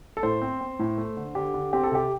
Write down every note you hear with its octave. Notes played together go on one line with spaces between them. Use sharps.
A4
A2 C5
C4
C4
A2
A3
D3
D3 G4
D3
C4 G4
A4
C3 G4